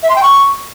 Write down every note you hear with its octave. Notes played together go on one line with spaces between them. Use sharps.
E5
C6
G5
C#6